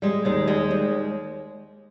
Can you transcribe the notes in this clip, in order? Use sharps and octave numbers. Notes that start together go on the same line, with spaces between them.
G3 G#3
D#2 G#3
G3 G#3
D#2